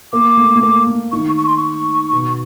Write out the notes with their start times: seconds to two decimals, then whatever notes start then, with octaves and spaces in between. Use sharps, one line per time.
0.13 A#3 D6
0.37 A3
0.56 A3
0.63 A#3
0.87 A3
1.12 D#3 C#6
1.37 C#6
1.47 C6
1.57 C#6
2.12 B2